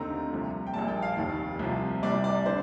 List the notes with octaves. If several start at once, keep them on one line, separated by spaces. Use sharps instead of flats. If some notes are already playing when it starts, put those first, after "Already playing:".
Already playing: D#2 D3 A3 C4 D#4 A#5
C2 C3 F3
G5
A#1 A#2 G3 A5
G5
F5
F1 D#2 D#3
C2 C3 F3
C2 C3 G3 D5
D5
D3 C5